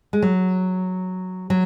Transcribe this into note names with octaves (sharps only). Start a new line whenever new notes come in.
G#3
F#3
F#3